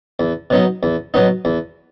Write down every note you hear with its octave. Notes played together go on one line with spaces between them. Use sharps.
E2
B2 F#3 B3 D#4
E2
B2 F#3 B3 D#4
E2